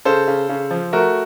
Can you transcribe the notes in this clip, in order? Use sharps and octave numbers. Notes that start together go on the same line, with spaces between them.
C#3 A4 C5
C#3
C#3
F3
A3 F#4 A#4